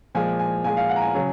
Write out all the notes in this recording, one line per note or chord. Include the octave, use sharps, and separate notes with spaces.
A#2 F3 G#3 G#5
G#5
A#2 F3 G#3 G#5
F5
F#5
A#5
G#5
C#3 F#3